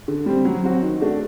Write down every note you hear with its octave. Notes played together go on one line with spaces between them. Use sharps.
D3
G3 C4
F#3
C4 F#4
D#3
A3 D4 F#4